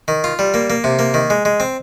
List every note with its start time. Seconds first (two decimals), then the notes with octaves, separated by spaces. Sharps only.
0.08 D#3
0.24 F4
0.39 G3
0.54 A#3
0.70 A#3
0.84 C3
0.99 A#3
1.14 D#3
1.30 G#3
1.45 G#3
1.60 C4